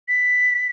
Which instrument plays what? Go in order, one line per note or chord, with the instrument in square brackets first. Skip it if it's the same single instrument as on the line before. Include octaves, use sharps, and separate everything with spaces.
[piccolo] B6